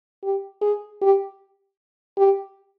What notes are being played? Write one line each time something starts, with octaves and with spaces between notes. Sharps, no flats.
G4
G#4
G4
G4